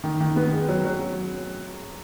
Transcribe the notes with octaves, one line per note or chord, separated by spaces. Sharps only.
D#3
D#3
B3
G#3
F#3
F#3